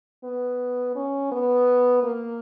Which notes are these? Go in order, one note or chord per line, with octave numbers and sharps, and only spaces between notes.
B3
C#4
B3
A#3